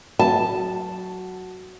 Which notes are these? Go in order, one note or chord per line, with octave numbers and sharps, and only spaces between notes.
F#3 A5